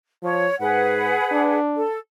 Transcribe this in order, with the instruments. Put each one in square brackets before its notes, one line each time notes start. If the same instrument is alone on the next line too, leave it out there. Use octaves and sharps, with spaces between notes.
[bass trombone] F3 [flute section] C#5
[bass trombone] G#2 [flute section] G#4 B4 F#5
[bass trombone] D4
[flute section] A4